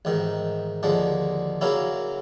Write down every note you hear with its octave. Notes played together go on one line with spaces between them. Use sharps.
A1 G#2 D#3
D#2 D3 F3 G#3
C#3 F#3 A#3 C#4 E4